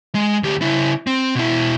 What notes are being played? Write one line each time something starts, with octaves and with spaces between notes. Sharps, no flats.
G#3
D2 G4
C#3 E4
C4
B2 E4